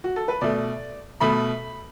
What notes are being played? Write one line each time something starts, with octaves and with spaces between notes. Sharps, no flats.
F#4
A4
B4
B2 A3 D5
B2 A3 B5